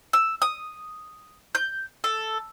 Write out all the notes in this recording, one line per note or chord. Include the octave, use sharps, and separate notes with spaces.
E6
D#6
G6
A4